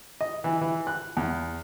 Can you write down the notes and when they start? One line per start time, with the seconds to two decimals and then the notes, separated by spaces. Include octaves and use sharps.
0.21 D#5
0.44 E3
0.61 E3
0.87 F#6
1.17 E2